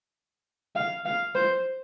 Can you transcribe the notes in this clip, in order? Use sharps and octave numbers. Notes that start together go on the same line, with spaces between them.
F5
F5
C5